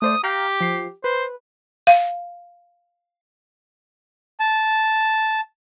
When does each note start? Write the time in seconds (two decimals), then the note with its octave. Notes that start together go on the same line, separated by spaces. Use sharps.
0.02 A3 C5 D5 D#6
0.24 G4 F5 G5 A#5
0.61 F3 C7
1.04 B4 C5
1.87 F5
4.40 A5